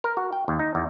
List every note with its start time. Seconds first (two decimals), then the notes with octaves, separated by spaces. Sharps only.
0.04 A#4
0.17 F#4
0.33 G5
0.48 D#2
0.59 D#4
0.75 E2